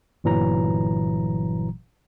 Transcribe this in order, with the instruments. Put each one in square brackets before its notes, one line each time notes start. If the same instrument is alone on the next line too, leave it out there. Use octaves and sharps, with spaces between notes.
[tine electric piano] G1 A#2 E3 F#3 A#5